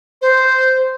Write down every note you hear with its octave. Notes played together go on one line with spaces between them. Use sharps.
C5